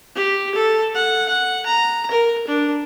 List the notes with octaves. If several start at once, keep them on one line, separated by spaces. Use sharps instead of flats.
G4
A4
F#5
F#5
A#5
A#4
D4